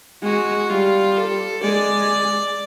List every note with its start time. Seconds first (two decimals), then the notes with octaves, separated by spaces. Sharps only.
0.23 G#3 F#4
0.69 G3 F4
1.17 A4
1.63 G#3 D5